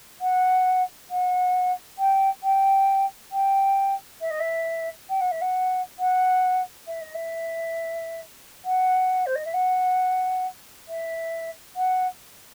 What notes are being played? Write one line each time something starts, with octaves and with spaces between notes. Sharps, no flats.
F#5
F#5
G5
G5
G5
E5
D#5
E5
G5
F#5
E5
F#5
F#5
E5
D#5
E5
F#5
C5
D#5
E5
F#5
E5
F#5